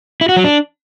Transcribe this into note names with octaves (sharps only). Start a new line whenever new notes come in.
E4
F#4
F#3
D4